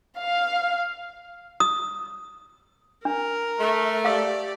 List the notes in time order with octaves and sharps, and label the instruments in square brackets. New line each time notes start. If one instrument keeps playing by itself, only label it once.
[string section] F5
[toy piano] D#6
[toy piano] D4 [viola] A#4
[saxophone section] A3
[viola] G4 D5 [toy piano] F5 E6